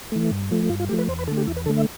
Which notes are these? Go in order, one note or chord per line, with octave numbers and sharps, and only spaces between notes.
E3 A3
G2
F3 A3
G2 F4
F4
F3 A3 G4
B4
E2 C5
B4
D3 A3 A4
G4
E2 E4
B4
D3 A3 A4
E5